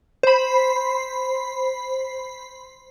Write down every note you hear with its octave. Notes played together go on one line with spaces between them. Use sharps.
C5 B5